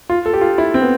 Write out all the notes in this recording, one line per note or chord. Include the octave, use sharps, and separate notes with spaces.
F4
A4
G4
F4
E4
C4
B3